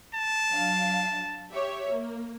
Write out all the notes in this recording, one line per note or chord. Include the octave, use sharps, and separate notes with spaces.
A5
F#3 D4 F5
G4 C#5 E5
A#3